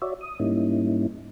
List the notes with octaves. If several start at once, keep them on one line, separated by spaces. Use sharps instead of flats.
F#4 C#5 D5 E5
D#6
G#2 G3 A#3 C#4 D#4 E4